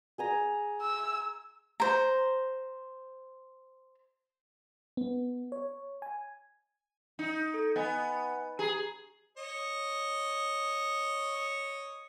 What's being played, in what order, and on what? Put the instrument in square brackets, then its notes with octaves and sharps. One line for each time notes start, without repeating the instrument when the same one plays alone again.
[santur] G#4 G#5 A#5
[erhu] E6
[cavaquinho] C5 A#5
[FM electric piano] B3
C#5
G#5
[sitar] D#4
[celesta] A4
[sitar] B3 [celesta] D#5 G#5
[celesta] G4 A#5 C7 [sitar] G#4
[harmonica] C#5 D#5